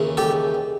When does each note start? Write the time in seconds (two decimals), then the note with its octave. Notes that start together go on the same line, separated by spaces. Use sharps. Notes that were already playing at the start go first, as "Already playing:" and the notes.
Already playing: D#2 C#3 E3
0.17 G4 A4